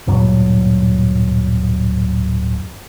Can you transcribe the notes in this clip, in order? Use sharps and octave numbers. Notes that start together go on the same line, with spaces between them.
D1 G2 A#2 F#3